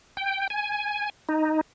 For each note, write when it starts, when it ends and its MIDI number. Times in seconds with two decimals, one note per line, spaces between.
0.17 0.47 79
0.50 1.10 80
1.29 1.61 63